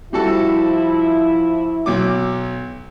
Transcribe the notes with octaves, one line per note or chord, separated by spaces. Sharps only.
F3 G3 E4 F#4 A4
B1 F#3 D6